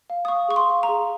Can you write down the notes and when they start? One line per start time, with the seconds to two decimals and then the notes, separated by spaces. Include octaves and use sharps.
0.10 F5
0.25 D#6
0.28 F5 C#6
0.48 G#4 C#6
0.56 C6
0.70 F5
0.83 A#5
0.89 G#4